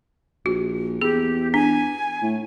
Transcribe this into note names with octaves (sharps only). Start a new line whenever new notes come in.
A#1 F#4
E2 G4 G#4
D4 G#5
A2